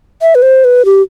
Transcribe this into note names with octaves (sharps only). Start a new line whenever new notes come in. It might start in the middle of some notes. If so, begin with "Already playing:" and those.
E5
B4
C5
B4
G4